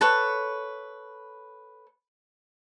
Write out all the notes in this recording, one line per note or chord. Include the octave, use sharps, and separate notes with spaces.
A4 B4 C#5